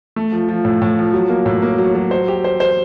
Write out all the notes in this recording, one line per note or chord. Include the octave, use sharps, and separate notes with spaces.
A3
F3
F3
A2
A2
F3
F#3
A#3
A2
A#3
F#3
F#3
C5
G4
C5
C5